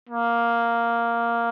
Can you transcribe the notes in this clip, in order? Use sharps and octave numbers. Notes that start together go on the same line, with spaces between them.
A#3